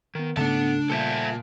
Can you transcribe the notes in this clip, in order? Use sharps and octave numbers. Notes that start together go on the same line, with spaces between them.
D#3 B3 A#4
G#2 C#3 A3 B3 D4 A4 A5 C#7
A#2 G3 A4 C5 E5 A5